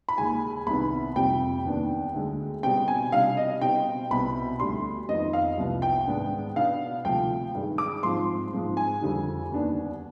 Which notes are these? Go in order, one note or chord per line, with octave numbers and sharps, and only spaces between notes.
B5
D#2 D#3 G#3 G#5
C2 C3 D#3 B3 B5
F2 C3 G3 C4 G5
D#2 D#3 B3 D4
D2 D3 G#3
B2 G3 C4 G5
G#5
C3 G3 D4 F5
D#5
B2 G3 C4 G5
C2 B2 B3 B5
D2 D3 G3 C6
F2 D#3 G3 B3 D#5
F5
C2 C3 F3 B3
G5
G#2 D#3 B3 D4
B2 B3 D4 F5
D2 C3 F3 G5
G2 D#3 G#3
D6
G#2 F3 C4 C6
G#2 F3 C4
G#5
F2 D3 G3 C4
D#2 D#3 B3 D4